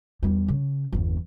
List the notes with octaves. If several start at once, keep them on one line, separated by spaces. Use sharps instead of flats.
E2 G3
C#3
G1 E2